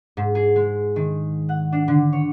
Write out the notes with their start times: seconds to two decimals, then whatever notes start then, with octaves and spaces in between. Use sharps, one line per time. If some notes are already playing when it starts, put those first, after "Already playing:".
0.17 G#2
0.35 G#4
0.56 G#3
0.96 D#3
1.49 F#5
1.72 D4
1.88 D3
2.13 C#5